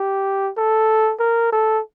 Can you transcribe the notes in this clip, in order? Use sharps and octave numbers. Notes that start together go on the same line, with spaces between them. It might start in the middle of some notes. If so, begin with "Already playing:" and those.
Already playing: G4
A4
A#4
A4